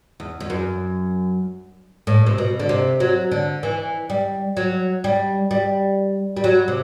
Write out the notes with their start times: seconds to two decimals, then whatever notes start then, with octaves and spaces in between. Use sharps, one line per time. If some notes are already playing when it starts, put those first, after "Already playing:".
0.20 E2
0.40 E2
0.50 F#2
2.07 A2
2.26 C3
2.38 B2
2.60 D3
2.69 C3
3.00 F#3
3.31 D3
3.63 E3
4.10 G3
4.57 F#3
5.04 G3
5.51 G3
6.36 G3
6.44 F#3
6.68 C3